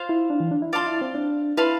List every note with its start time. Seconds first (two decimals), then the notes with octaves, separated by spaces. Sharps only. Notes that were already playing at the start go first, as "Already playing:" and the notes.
Already playing: F4 C5 F5
0.09 E4
0.30 D4
0.40 E3
0.51 D4
0.62 E4
0.73 F4 D5 F5 A5 C6
0.87 E4
1.01 C4
1.15 D4
1.57 E4 B4 F5 A5 C6